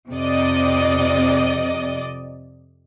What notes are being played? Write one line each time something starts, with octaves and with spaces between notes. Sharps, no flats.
F2 C3 D5 D#5